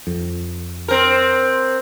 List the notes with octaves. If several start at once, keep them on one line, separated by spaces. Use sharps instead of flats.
F2
C4 A#4